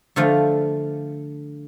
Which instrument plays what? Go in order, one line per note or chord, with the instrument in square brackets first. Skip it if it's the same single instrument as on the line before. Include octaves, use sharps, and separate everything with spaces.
[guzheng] D3 F3 A3 F4